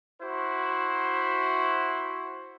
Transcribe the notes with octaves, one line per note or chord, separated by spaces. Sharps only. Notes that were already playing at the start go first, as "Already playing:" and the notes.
E4 F#4 C5